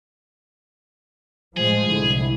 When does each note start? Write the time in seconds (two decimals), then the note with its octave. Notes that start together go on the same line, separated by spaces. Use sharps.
1.57 A2 F3 G#3 G#4 C5
1.90 C2 D3 E4